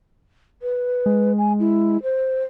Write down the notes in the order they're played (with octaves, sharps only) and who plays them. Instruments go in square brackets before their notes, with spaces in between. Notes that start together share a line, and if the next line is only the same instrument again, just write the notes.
[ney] B4
[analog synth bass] G#3
[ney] G#5
E4
C5